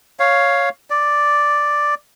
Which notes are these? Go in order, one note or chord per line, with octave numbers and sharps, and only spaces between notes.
C#5 F5
D5